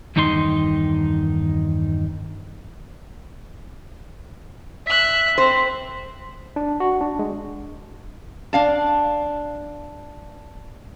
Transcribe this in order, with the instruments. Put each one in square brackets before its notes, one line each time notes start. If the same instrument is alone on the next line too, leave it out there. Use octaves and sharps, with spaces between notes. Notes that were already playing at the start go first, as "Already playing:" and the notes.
[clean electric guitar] E2 G2 D#3 D#4 A#5 C6
[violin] E5 F#6 [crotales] B6 F#7
[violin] C4 [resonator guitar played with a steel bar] C5
[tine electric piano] D4
F#4
D4
G#3
[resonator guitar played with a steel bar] D4 F5 A5